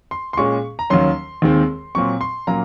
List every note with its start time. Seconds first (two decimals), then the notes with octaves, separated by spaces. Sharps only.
0.11 C6
0.33 C6
0.37 A#2 G#3 C#4 C#6
0.79 A#5
0.90 D#2 D#3 F#3 C#4 C6
1.42 D#2 D#3 G#3 C4
1.95 A#2 F#3 C4 C#6
2.21 C6
2.47 A#2 F#3 A#3 C#4 A#5